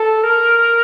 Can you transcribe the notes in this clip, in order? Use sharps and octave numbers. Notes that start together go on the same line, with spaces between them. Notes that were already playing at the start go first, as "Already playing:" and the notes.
Already playing: A4
A#4